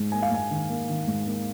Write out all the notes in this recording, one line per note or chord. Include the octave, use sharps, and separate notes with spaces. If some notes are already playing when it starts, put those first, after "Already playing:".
Already playing: G#2
A#3 G#5
F5
G#2 G#5
D#3
A#3
D#3
G#2
A#3